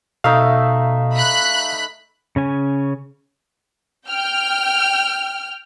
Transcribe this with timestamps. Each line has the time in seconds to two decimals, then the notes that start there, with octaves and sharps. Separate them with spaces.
0.24 B2 A3 D#4 E5 F5
1.13 B5 F#6
2.36 C#3 C#4 G#5
4.09 G5 F6